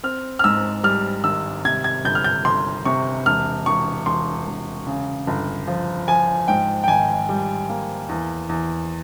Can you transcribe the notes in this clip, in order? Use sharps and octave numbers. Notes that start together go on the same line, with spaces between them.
C4 F6
F6
G#2 E6
G3 F6
G#1 E6
C3 G#6
G#6
G1 G6
F6
G6
G1 C6
C3 C#6
E1 F6
E1 C#6
E1 C6
E1
C#3
G1
F3
F3 G#5
G#2 G5
G5
G#1 G#5
G3
A#3
E2
E2